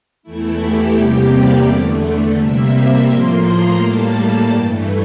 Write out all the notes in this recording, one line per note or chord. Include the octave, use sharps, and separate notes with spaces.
E2 E3 A3 E4
G4
E2 C3 G3 A#3 G4
D5
E2 D3 A3
C3 G3 A#3 E5
A2 F3 A#3 C6
A#5
A2 G3 A#3 A5
G2 E3 A3